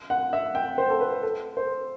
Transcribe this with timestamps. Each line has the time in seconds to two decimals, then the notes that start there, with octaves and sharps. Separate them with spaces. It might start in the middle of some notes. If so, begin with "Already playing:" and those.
0.10 F#5
0.33 E5
0.55 G5
0.78 C5
0.90 A4
1.01 B4
1.23 A4
1.57 C5